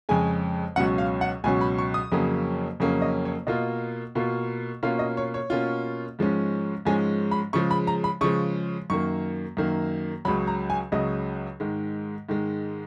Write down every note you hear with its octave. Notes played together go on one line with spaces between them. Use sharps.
F2 C#3 G#3 G#5
C#2 B2 F#3 C#4 F#5
F5
F#5
C#2 B2 F#3 C#4 G#5
B5
C#6
D#6
F2 C#3 F#3 A#3 C#4
F2 C#3 F#3 A#3 C#4
D#5
C#5
B2 A#3 F4 D#5
B2 A#3 F4
B2 A#3 C#4 F4 F5
D#5
C#5
C#5
B2 A#3 C#4 F4
G#2 F3 G#3 C#4
G#2 F3 G#3 C#4 G#5
B5
C#3 F3 G#3 C#6
B5
A#5
B5
C#3 F3 G#3 C#6
F#2 D#3 A#3 C#6
F#2 D#3 A#3
C#2 C#3 F#3 B5
A#5
G#5
C#2 C#3 F#3 D#5
G#2 D#3 G#3
G#2 D#3 G#3